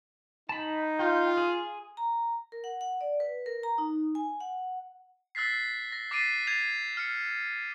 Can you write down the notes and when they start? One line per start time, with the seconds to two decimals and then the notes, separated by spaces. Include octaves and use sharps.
0.49 D#4 A5 B5
0.99 F4 G5
1.37 G#4
1.97 A#5
2.52 A#4
2.64 F#5
2.81 F#5
3.01 D5
3.20 B4
3.46 A#4
3.63 A#5
3.78 D#4
4.15 G#5
4.40 F#5
5.35 E6 F#6 A6 B6 C7
5.92 A#6
6.11 D6 A6 B6 C7 D7 D#7
6.47 G#6 A6 C7 D#7 F7
6.97 F6 C#7